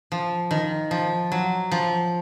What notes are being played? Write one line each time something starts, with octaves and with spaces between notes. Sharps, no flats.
F3
D#3
F3
F#3
F3